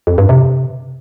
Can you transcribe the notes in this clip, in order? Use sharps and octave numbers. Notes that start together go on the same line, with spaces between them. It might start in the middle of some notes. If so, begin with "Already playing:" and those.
F2
G2
C3